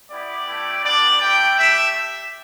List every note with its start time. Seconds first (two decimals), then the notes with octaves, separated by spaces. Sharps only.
0.10 B3 E4 G4 D5
0.47 A3 E4 G4
0.84 B3 D4 G4 D5
1.21 A3 E4 G4 G5
1.58 A3 G4 E5